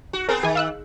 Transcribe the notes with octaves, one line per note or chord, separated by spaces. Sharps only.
F#4
B3 C4 G#4 A#4
D#3 G#4 G#5
F5 E6 F#6